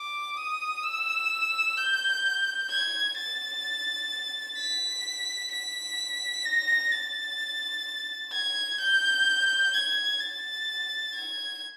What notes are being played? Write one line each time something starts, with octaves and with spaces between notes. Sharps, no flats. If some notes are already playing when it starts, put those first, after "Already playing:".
Already playing: D6
D#6
E6
G6
G#6
A6
B6
B6
A#6
A6
G#6
G6
G#6
A6
G#6